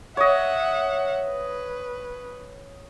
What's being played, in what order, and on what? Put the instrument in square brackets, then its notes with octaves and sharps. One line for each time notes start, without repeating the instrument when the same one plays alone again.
[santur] C#5 D#5 [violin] E5 F#5
[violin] B4